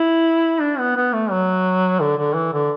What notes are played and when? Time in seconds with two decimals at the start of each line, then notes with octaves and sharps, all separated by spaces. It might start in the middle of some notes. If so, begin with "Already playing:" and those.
Already playing: E4
0.61 D4
0.79 B3
0.96 B3
1.13 A3
1.31 F#3
2.00 D3
2.18 D3
2.35 E3
2.53 D3